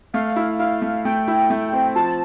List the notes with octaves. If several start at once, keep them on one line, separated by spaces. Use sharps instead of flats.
A3 F5
E4
E4 F5
A3
A3 G5
E4
A3
C4
F3 A5